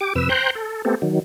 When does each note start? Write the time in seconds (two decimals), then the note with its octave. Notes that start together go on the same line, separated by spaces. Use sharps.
0.01 G4 D6
0.15 F2 C3 B4 E6
0.29 C5 G5 A#5 C6 F#6 G6
0.55 A4
0.85 A3 B3 C4 G4 A4
1.02 D#3 F#3